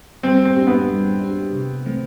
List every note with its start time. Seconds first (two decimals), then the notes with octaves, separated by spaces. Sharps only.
0.23 G3 C4
0.45 C4
0.56 D4 G4
0.67 B3
0.89 G3
1.21 D4 G4
1.53 C3
1.85 E3 A3 C4